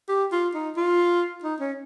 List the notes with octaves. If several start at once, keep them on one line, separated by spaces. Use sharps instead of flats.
G4
F4
D#4
F4
D#4
C#4